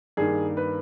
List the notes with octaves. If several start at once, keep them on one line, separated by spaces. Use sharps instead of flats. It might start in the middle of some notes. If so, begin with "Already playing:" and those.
G2 D#3 A#3 G#4
B4